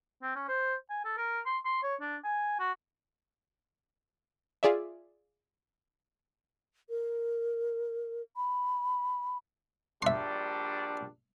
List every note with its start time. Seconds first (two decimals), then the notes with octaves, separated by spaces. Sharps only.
0.22 C4
0.36 C#4
0.48 C5
0.90 G#5
1.05 A4
1.17 A#4
1.46 C6
1.65 C6
1.83 C#5
2.00 D4
2.24 G#5
2.59 F#4
4.63 F4 G#4 D5 E5
6.89 A#4
8.36 B5
10.02 A#1 G3 D4 E5 C6